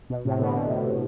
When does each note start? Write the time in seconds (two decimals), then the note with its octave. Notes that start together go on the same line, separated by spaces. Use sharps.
0.10 B2
0.25 A2 C3
0.40 B2 D3
0.55 A2 C3
0.70 A2 C3